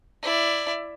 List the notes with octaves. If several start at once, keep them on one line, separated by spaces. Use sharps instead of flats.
E4 D5